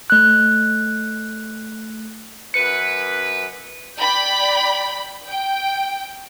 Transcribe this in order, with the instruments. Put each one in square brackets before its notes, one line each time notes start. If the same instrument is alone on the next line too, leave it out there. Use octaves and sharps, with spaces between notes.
[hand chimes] A3 F#6
[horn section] F#2 B4 [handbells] C#7
[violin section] D5 G5 B5
G5